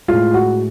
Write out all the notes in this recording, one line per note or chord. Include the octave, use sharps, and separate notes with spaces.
A2 G#3 F4
F#4